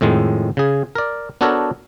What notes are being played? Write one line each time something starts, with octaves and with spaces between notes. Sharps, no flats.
F2 A2 D#3 G#3
C#3 G#4
A#4 D5
B3 D4 F#4 A4 A#4 C#5